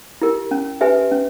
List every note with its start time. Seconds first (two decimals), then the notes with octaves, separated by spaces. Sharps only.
0.21 E4 G4 A#4
0.51 C#4
0.81 G4 B4 E5 G#5
1.11 C#4